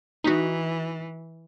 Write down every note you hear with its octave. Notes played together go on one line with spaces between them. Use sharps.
E3 D#4 F#4